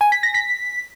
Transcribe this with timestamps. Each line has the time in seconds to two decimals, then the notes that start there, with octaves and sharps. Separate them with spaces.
0.01 G#5
0.12 B6
0.23 A#6
0.34 B6